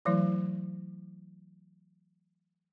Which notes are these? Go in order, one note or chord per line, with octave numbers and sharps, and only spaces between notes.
E3 F#3 A3 E4